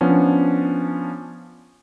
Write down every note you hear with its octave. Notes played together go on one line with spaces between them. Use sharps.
F3 B3 C#4 D4